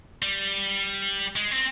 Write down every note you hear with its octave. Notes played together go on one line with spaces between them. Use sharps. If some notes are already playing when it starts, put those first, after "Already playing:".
G3
G#3
C4